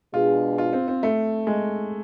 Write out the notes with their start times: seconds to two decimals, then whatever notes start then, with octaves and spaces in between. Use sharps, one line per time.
0.13 B2 G#3 D4 F4 G#4
0.58 F4
0.73 C4
0.88 C4
1.03 A3
1.47 G#3